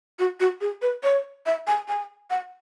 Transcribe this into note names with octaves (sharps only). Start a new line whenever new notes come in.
F#4
F#4
G#4
B4
C#5
E5
G#5
G#5
F#5